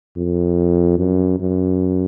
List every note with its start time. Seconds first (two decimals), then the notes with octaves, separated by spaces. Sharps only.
0.17 F2
0.98 F#2
1.40 F#2